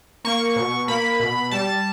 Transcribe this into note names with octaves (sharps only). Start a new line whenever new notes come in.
A#3 C#6
B2
A#3 B5
B2
G3 A5